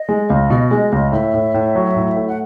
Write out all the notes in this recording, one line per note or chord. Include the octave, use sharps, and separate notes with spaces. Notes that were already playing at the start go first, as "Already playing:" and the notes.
Already playing: D#5
G#3
C#2
B2
G#3
C#2
A2 E5
A2
A2
F#3
A2
A3
F#5